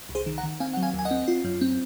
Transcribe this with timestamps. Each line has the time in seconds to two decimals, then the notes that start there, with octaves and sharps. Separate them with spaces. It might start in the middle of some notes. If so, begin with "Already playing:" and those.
0.09 C2
0.15 G#4 C5
0.26 D#3
0.38 F#5 A#5
0.43 D#3
0.60 C4 F5 G#5
0.74 F#3 F#5
0.82 F5 G#5
0.94 D#2
0.99 G#5
1.05 D#5 F#5
1.11 C4
1.28 F4
1.44 F#2
1.61 C4